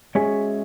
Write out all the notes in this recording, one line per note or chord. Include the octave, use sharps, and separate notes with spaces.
G#3 C#4 F#4 G#4 C#5 E5